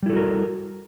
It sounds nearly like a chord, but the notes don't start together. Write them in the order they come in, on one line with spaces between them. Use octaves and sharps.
G3 E4 A4 F#4 A#4